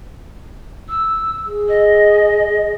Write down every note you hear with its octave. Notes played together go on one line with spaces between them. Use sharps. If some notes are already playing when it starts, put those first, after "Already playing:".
E6
G#4
D#5